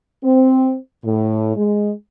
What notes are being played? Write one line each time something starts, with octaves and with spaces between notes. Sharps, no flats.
C4
A2
G#3